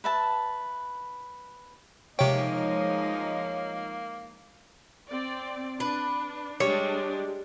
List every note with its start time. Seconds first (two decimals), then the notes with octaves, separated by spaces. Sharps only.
0.04 B4 E5 A5
2.19 C3 F3 G#3 A#3 D#4 C#5 G5
5.06 C4 D5
5.80 D4 B4
6.60 G3 G#3 D4 C#5